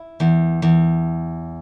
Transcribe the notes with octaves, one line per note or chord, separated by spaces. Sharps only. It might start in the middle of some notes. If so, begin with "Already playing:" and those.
Already playing: E4
E2
E2